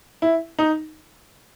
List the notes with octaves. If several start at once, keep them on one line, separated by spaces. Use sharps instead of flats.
E4
D#4